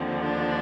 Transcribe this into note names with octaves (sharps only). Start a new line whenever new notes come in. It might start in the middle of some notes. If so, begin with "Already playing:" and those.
Already playing: D#2 D3 F3 C4
D4